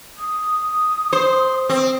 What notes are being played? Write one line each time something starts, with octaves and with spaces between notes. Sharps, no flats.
D#6
C5
C4